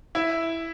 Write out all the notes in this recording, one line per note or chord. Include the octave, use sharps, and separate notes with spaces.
E4 E5